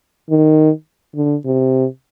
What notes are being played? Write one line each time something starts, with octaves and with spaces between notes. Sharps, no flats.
D#3
D3
C3